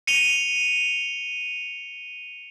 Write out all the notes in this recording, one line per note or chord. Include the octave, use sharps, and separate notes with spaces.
C#7 D#7 F7 G7